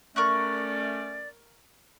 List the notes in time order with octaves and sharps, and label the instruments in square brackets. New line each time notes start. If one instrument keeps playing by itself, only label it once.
[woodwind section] A3 C#4 D5 [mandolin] A#4 C#6 F#6